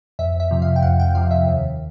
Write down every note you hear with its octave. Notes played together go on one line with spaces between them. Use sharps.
F2 E5
E5
C3 F3
F5
G5
F2 F#5
G5
C3 F3 F5
E5
D#2